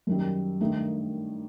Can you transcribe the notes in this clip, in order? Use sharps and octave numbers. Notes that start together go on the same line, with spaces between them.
F#2 D#3 G3
G2 D#3 A3 D#4